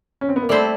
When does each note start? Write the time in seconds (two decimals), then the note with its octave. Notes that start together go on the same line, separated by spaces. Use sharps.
0.21 C#4
0.29 C4
0.36 B3
0.43 A#3
0.49 G3 A3 C4 E4 A4 C5